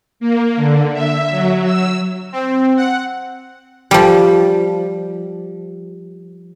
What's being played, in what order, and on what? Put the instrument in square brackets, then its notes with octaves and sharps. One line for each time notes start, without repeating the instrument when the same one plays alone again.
[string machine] A#3
D3
E5
F#3
E6
[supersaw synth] C4
F#5
[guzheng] F3 G3